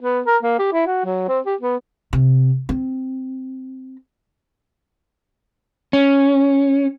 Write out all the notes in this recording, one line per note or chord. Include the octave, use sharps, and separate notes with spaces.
B3
A#4
A#3
G4
E4
F#4
F#3
C4
G4
B3
C3
C4
C#4